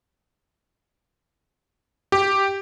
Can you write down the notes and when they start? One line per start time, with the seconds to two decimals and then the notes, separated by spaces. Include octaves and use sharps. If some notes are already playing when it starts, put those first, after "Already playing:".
2.12 G4